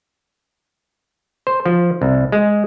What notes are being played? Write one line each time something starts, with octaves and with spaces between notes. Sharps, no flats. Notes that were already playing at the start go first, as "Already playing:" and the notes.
C5
F3
C2
G#3